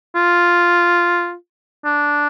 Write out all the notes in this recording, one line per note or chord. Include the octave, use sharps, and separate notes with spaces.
F4
D4